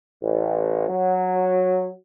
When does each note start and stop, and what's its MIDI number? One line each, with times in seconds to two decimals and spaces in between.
0.22 0.83 33
0.89 1.91 54